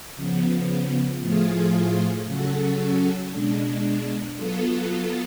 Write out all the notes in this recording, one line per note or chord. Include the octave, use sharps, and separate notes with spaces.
C#3 F3 B3
A2 F3 A3 F4 G#4
C#3 F#3 C#4 F#4 A4
B2 G#3 D4
F#3 B3 F4 A4